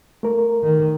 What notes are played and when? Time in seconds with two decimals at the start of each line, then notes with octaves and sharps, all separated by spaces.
0.23 A3 A#4
0.63 D#3